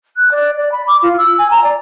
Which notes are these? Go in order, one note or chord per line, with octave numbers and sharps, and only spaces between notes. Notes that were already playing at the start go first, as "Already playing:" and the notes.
F#6
D5
D5
B5
D6
F4
E6
G#5
A#5
D5